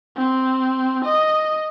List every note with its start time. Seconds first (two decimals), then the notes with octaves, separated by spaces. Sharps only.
0.16 C4
1.05 D#5